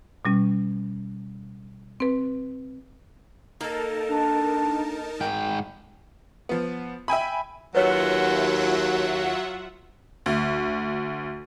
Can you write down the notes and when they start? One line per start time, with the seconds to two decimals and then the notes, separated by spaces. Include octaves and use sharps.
0.25 B2 G3 C#4
2.00 C4 B4
3.61 A#3 D#4 A4 A#4 A5
4.10 D4
5.21 G#2 G5
6.49 F3 B3
7.08 E5 G5 G#5 B5
7.75 D#2 F#3 F4 B4 C#5 E5 F#5
10.26 D2